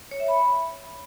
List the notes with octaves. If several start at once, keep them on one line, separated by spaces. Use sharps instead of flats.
C#5
E5
B5